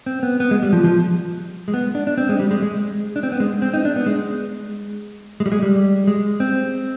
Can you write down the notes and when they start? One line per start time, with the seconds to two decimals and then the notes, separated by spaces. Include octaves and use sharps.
0.06 C4
0.23 B3
0.40 B3
0.51 G#3
0.63 G3
0.73 F3
0.85 F3
1.68 G#3
1.74 B3
1.95 D4
2.07 D4
2.18 C4
2.29 G#3
2.40 G3
2.51 G#3
2.62 G#3
3.16 D4
3.23 C4
3.32 B3
3.40 G#3
3.62 C4
3.73 D#4
3.85 D4
3.96 B3
4.06 G#3
5.40 G#3
5.46 G3
5.52 G#3
5.63 G3
6.07 G#3
6.40 C4